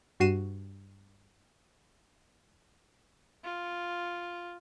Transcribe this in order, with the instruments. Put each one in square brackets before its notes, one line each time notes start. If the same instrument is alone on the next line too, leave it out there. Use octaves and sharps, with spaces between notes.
[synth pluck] G2 F#4 C7 D#7 E7
[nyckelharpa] F4